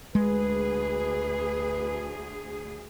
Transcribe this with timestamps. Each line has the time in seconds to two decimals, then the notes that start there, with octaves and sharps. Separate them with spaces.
0.15 D2 G#3 G#4 B4